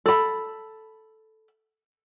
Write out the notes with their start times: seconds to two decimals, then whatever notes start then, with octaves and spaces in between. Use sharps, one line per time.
0.06 A4 B5